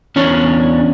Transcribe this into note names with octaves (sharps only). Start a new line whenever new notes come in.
E2 C#4 D4 C#5